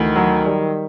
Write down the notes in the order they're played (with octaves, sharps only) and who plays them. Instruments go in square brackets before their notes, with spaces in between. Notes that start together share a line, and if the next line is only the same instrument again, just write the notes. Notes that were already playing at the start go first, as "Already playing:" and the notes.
Already playing: [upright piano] D2 E3 [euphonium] D#3
[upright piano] F#3
G3